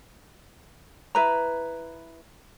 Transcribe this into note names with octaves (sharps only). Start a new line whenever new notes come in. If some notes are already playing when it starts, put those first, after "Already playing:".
E4 B4 A#5